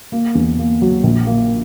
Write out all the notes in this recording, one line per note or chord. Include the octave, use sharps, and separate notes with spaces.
A#3
E2
A#3
F#3
A#1
A#3